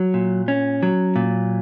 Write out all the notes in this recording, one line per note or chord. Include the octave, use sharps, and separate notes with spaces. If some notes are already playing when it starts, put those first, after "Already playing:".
Already playing: F#3
A#2
C#4
F#3
A#2